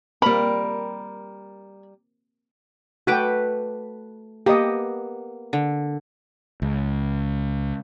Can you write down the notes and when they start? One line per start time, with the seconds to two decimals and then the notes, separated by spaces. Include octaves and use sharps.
0.22 G3 A#3 C4 A#4 B5
3.07 A3 F#4 B4 G5 D6
4.46 A#3 B3 G4 D#5
5.53 D3
6.62 C#2